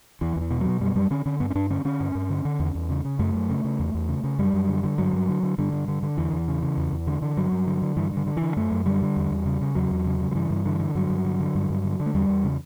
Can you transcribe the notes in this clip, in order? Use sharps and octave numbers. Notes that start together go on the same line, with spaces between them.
E2 E3
E2
E3
B2
B2 F#3
F#2 G3
F#2 G3
D3 C#4
D3 C#4
G2 B3
C#4
G2 D4
D3 C#4
D3 C#4
G2
G2
D3
D3
E2
E2
C#3
C#3
F#2 A3
F#2
C#3
C#3
E2
E2
C#3
C#3
F#2 G3
F#2
D3
D3
G2 F#3
G2
D3
D3
G2 D3
G2
D3
D3
E2 E3
E2
C#3
C#3
E2
E2
D3
D3
G2 F#3
G2
D3
D3
G2 E3
G2 D3
D3
D3 E3
F#2 A3
F#2
D3 G3
D3
E2
E2
C#3
C#3
E2 F#3
E2
C#3
C#3
F#3
G2 E3
G2
D3 E3
D3
G2 F#3
G2
D3
D3
G2
G2
D3
D3
A3
E2 G3
E2
C#3